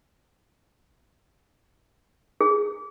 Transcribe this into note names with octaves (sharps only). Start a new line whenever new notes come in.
G#4